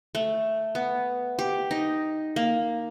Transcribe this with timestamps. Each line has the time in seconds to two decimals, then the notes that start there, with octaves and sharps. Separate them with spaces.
0.15 A3
0.75 B3
1.39 G4
1.71 D#4
2.36 A#3